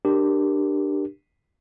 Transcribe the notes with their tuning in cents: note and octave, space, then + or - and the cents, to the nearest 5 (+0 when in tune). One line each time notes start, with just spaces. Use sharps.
D4 +20 G4 +0 A#4 +0